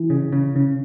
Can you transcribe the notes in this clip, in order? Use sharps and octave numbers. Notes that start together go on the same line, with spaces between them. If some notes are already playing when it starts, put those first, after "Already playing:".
Already playing: E3
C#3
C#3
C#3